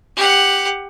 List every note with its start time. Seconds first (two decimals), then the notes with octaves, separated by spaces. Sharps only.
0.16 G4 F#5